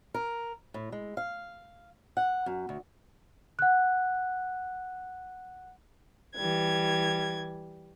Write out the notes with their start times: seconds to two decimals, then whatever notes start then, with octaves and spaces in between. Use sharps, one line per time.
0.14 A#4
0.74 A2
0.92 G#3
1.17 F5
2.17 F#5
2.46 F#2
2.69 D2
3.59 F#5 F#6
6.35 E3 G3 G#6